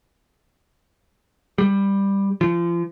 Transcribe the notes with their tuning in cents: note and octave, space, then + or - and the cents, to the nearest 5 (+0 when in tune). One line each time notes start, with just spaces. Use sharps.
G3 +10
F3 -35